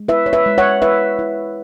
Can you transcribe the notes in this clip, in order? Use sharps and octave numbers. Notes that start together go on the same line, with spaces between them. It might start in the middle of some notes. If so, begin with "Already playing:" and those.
Already playing: G#3
E4 B4 E5
C#5
B4 E5
G#3
C#5 F#5
E4 B4 E5
E4